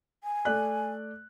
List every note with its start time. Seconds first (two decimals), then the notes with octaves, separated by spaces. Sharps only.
0.24 G#5
0.45 A3 D5 F#6